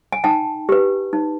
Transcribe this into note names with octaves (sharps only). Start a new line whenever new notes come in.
G#5
D#4 G5 A5
G4 B4
D#4